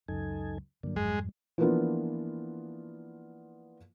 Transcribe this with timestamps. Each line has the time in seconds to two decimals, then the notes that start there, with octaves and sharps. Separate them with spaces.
0.08 C#2 F#2 D#4 A4 G#5
0.83 G2 D3 F#3 A#3 D4
0.96 G1 F2 G#2 F#3 G#3
1.12 G3
1.58 E3 F3 A#3 B3 D4 F4